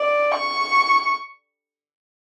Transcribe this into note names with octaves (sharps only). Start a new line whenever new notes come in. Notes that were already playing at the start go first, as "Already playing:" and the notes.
Already playing: D5
C#6